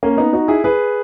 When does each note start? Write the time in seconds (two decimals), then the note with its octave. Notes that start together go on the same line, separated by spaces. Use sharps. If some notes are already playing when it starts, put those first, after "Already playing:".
0.03 A#3 C#4
0.17 B3 D#4
0.33 D#4 F#4
0.48 E4 G#4
0.64 G#4 B4